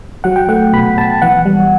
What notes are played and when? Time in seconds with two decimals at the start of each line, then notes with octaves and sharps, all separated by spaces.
0.24 F#3 F#5
0.36 G5
0.48 A3 F#5
0.73 B2 B5
0.97 B2 A5
1.22 E3 F#5
1.46 G3